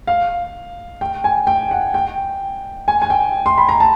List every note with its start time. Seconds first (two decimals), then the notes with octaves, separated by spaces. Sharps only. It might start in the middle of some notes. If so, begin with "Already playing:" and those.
0.07 F5
1.01 G5
1.24 G#5
1.47 G5
1.71 F#5
1.94 G5
2.88 G#5
3.02 G#5
3.10 G5
3.46 C6
3.58 B5
3.69 A#5
3.80 A5